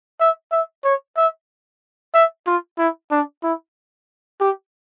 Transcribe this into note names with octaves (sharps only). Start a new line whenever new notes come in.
E5
E5
C#5
E5
E5
F4
E4
D4
E4
G4